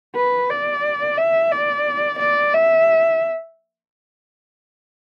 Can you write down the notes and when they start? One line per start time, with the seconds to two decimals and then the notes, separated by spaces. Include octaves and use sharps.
0.15 B4
0.50 D5
1.17 E5
1.51 D5
2.19 D5
2.54 E5